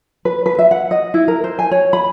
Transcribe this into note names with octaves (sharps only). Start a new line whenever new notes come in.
B4
B4
E5
F#5
D#5
E4
A#4
C5
G#5
C#5
B5